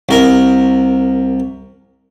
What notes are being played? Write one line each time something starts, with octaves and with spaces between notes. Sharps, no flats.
C2 A#4